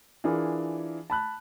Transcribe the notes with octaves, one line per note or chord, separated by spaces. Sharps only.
E3 D4 F4 G#4 A#4
A5 B5 F#6